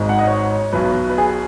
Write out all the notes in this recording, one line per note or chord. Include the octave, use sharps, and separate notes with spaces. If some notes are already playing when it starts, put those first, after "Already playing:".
Already playing: G#1 G#2 G#3
F#5
D#5
C#5
B1 B2 F#3 B4
B4
G#4